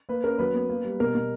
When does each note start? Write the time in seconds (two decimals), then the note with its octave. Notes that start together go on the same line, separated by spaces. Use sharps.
0.09 A#3 B4
0.24 C#4 A#4
0.39 F#3 B4
0.54 B3
0.69 A#3
0.85 G3
1.00 B2 A#4
1.15 B2